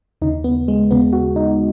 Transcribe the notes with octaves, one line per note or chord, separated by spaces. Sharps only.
D#2 C#3 D#4
B3
G#3
D#2 C#3 B3
F#4
D#4